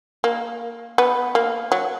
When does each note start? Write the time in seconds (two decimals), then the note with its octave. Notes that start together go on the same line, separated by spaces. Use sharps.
0.24 A#3
0.98 B3
1.35 A#3
1.72 F#3